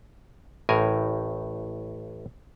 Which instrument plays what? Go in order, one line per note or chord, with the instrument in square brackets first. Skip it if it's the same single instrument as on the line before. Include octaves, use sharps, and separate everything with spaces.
[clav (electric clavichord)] A1 A2 A#4 G#5